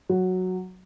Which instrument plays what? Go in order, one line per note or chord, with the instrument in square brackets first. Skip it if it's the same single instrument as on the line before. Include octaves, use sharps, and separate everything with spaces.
[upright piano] F#3